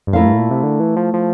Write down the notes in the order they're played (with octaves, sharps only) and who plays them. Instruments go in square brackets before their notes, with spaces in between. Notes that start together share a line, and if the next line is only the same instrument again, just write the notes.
[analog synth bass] G2
[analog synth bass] F2 [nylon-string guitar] A3 E4 A#4 F5
[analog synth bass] G2
A2
A#2
C3
D3
E3
F3
F3